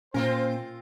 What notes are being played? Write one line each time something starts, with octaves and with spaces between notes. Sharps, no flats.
A#2 A#3 C4 C#4 F4 A#4 C5